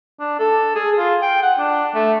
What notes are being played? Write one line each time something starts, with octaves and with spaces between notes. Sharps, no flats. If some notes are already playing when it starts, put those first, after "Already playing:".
D4
A4
G#4
F4
G5
F#5
D4
A3